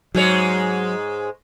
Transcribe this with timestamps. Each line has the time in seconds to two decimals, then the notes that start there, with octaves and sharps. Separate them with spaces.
0.15 G#2 F#3 G#3 C#5